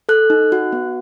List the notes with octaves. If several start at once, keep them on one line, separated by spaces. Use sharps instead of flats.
A4 F#6
D#4
F#4
B3